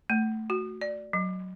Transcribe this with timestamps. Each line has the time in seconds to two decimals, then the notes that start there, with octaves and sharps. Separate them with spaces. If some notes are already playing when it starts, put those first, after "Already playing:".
0.10 A3
0.50 F#4
0.81 D5
1.13 F#3